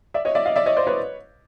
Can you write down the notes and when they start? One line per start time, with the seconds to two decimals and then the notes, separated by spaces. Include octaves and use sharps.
0.14 D5 E5
0.25 C#5 D#5
0.35 D5 E5
0.45 D#5 F5
0.56 D5 E5
0.66 C#5 D#5
0.77 C5 D5
0.87 B4 C#5